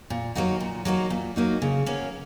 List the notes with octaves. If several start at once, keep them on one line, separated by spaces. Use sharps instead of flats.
A#2
F#3 A#3 D#4 F#4
A#2
F#3 A#3 D#4 F#4
A#2
F#3 A#3 D#4 F#4
C#3
A#3 C#4 F#4